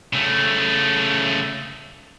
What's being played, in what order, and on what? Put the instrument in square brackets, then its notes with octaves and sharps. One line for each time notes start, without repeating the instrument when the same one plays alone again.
[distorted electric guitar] C#3 A3